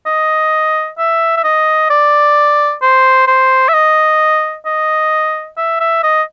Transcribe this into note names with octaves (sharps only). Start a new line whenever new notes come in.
D#5
E5
E5
D#5
D5
C5
C5
E5
D#5
D#5
E5
E5
D#5